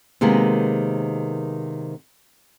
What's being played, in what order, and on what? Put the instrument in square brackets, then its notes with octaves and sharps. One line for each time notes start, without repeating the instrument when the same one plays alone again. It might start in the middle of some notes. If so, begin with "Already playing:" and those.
[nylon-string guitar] C3 D#3 G#3 A#3 B3